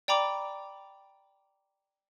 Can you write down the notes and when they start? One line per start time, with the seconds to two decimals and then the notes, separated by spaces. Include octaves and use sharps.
0.08 D5 G5 A#5 B5 D6